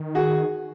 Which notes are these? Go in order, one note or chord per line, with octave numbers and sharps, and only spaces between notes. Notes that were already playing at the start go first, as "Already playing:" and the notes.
Already playing: D#3
F#4 G#4